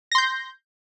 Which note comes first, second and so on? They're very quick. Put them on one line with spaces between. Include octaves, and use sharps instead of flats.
A#6 C6 G6